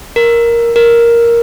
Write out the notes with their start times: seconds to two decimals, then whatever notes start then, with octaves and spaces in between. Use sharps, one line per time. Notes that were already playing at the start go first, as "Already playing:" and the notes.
0.16 A#4
0.76 A#4